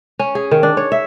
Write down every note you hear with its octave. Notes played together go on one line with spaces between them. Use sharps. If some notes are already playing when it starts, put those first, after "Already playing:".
C#4
G#4
D#3
D4
C#5
E5